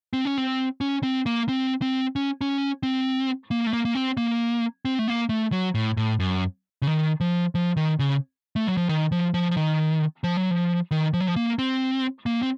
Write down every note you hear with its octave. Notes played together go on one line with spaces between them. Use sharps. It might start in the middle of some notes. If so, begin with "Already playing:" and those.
C4
C#4
C4
C#4
C4
A#3
C4
C4
C#4
C#4
C4
A#3
A3
A#3
A#3
C4
A#3
C4
A3
A#3
A3
F#3
A2
A2
F#2
C#3
D#3
F3
F3
D#3
C#3
A3
F#3
F3
D#3
F3
F3
F3
D#3
F3
F#3
F3
D#3
F3
F#3
F3
A#3
C4
A#3
C4